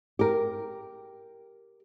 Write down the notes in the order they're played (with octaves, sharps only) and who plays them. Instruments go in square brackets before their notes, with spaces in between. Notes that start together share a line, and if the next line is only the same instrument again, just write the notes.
[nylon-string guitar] G4 A#4